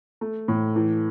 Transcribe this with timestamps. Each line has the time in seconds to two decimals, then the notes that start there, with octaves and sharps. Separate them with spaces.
0.21 A3
0.48 A2
0.76 E3